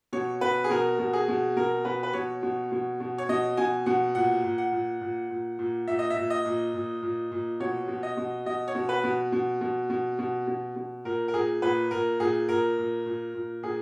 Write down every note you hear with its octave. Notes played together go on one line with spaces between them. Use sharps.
B2 C#5
B2 B4
G#4
B2 A#4
B2
G#4
B2
B2 A#4
B2 B4
B4
B2 C#5
B2
B2
B2
C#5
B2 D#5
B2 G#5
B2 F#5
A#2 F#5
A#2
F#5
A#2
A#2
A#2
A#2
A#2 E5
D#5
E5
A#2
D#5
A#2
A#2
A#2
A#2
B2 C#5
B2
D#5
B2
B2 D#5
C#5
B2
B4
B2
B2
B2
B2
B2
B2
B2
A#2 A#4
A#4
A#2 G#4
A#2 B4
A#2 A#4
A#2 G#4
A#2 A#4
A#2
A#2
A#2
A#2 G#4